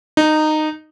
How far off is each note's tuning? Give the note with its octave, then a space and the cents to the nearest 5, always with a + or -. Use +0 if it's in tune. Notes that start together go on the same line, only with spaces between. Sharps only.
D#4 -15